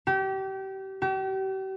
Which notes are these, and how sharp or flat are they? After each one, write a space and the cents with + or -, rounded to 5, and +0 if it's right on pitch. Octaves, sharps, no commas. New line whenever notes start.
G4 -30
G4 -40